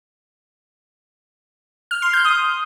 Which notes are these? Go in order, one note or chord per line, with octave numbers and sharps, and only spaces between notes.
F6
C6
G6
D#6